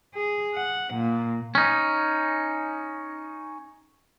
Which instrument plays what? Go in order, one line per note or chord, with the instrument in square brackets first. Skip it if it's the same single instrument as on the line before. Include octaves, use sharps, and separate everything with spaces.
[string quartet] G#4
F#5
A#2
[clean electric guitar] C#4 D#4